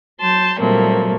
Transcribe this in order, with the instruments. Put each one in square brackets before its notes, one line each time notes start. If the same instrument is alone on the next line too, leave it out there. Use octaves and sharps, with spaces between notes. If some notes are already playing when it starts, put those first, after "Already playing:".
[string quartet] F#3 A5 C6 G6
A#2 F#3 G3 A3 A#3 C4